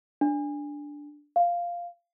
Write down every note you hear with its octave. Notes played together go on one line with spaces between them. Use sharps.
D4
F5